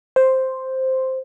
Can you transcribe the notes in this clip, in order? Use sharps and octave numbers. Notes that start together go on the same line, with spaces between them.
C5